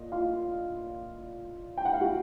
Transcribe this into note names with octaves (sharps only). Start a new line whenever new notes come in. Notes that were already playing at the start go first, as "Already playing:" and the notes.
Already playing: A#2 D#5
F4 F5
G5
F#5
F5
F#4 F#5